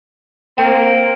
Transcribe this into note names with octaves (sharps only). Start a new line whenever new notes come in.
A#3 C4 G5